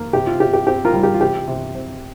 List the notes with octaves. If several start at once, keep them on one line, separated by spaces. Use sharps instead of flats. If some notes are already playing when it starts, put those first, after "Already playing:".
Already playing: A#3
C3 G4
F4
C3 G4
G4
C4 G4
F4 A#4
G3
G4
F4
C3 G4
C3
C4